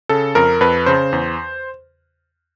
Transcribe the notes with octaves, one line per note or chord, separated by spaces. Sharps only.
C#3 A4
F2 A#4
F2 B4
C#3 C5
E2